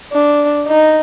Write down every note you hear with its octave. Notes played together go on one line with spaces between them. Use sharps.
D4
D#4